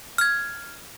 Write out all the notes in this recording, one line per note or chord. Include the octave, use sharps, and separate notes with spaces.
F6 G#6